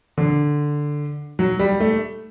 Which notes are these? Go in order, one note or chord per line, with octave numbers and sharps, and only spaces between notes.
D3
F#3
G3
A3